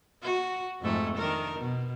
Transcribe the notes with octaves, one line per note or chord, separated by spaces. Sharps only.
F#4
F2 G#2 A3
D#3 D4 A#4
B2